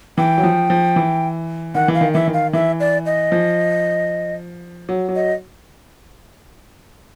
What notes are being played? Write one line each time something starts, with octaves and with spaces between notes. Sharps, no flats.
E3 G5
F#3
F3
F3
E3
D#3 F#5
E3
F5
D#3
E3 E5
D#3
F5
E3 E5
D5
D#5
F3
F#3
F#3
D#5